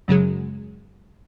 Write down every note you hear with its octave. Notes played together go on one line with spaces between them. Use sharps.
F#2 C#3 F#3 G#3